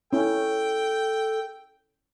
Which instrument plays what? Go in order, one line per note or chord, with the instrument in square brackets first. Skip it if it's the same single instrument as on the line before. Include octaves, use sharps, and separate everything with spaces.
[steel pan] C#4 E4 [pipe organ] A4 [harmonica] G5